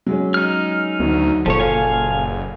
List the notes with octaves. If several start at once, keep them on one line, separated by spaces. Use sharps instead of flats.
F#3 G#3 C#4
D#4 F6
D2 D#3 F#3
F#1 A#2 F3 A4 C#5
F5 G#5